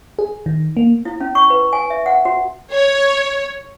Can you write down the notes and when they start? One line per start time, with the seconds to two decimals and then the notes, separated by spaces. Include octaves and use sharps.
0.19 G#4
0.46 D#3
0.77 A#3
1.05 E4
1.20 C#4
1.35 C#6
1.50 B4
1.73 G#5
1.90 E5
2.06 F#5
2.25 F#4
2.72 C#5